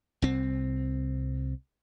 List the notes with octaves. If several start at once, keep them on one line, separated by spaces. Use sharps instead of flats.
C2 C4